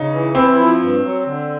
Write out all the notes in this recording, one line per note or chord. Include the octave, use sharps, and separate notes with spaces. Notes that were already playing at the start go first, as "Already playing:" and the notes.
Already playing: C#3 D#4
E3
C4 E4
F3
G2
F#3
D3